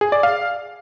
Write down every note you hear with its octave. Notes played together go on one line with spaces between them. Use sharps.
G#4
D5
F5